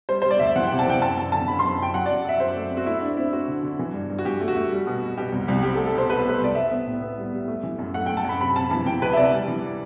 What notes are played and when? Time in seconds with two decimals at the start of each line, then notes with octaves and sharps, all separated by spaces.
0.09 G3 C5
0.22 G3 C5
0.31 D5
0.39 D2 E5
0.56 E3 F#5
0.67 C3 G5
0.79 A5
0.86 E3 G5
1.01 F#2 A5
1.17 F#2 A5
1.32 D3 A5
1.48 F#2 B5
1.59 F#2 C6
1.79 F#2 G5
1.93 F#3 F#5
2.06 F#2 D5
2.25 F#3 E5
2.40 F#2 C5
2.56 A3
2.70 C4
2.77 F#4
2.86 A3 E4
3.02 A3 D4
3.17 C4 E4
3.33 C4 F#4
3.48 D3
3.63 D3
3.79 E3
3.94 G2
4.10 G2
4.19 F#4
4.25 G2 G4
4.40 A3
4.48 F#4
4.56 A3
4.72 G3
4.87 B2
5.02 B2
5.17 B2 G4
5.32 C2
5.47 C2 G4
5.63 C4 G4
5.75 A4
5.79 A3
5.86 A4
5.94 B2 C5
6.09 B2 B4
6.19 A4
6.25 A3 B4
6.40 C2 D5
6.55 B3 E5
6.71 B3
6.87 A2
7.01 B3
7.18 G3
7.33 G3
7.48 A3
7.63 E3
7.79 F#2
7.94 A3 F#5
8.06 A3 G5
8.17 A5
8.24 F#2 B5
8.40 C3 B5
8.56 C3 A5
8.71 E3 A5
8.86 E3 G5
9.02 D2 B4
9.13 E5
9.17 C3 D5
9.33 G3
9.48 E3